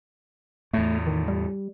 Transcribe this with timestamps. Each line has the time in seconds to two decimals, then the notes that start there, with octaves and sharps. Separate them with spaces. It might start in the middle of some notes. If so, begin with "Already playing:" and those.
0.74 E2 A2 A3
1.07 D#3
1.28 G3